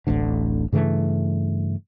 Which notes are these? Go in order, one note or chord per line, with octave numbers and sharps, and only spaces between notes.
D1 A1 D2 D3
G2 C#3 E3 A3